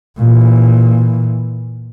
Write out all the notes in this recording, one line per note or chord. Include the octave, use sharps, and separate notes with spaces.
A#2 E3